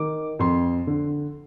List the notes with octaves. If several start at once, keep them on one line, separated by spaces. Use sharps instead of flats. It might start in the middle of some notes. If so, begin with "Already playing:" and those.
Already playing: D#3 D6
F2 C6
D3